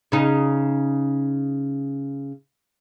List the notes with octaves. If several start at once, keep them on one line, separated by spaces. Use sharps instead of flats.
C#3 D#4